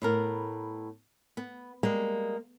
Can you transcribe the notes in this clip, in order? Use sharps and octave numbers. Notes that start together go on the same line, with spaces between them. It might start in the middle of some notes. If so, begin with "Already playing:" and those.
A2 B3 A#4
B3
G3 G#3 A#3